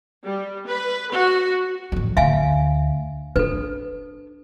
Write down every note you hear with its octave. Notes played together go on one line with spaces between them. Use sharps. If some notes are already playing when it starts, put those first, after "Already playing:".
G3
B4
F#4
A1 F2
D2 E5 F5 G#5
D4 A4 B4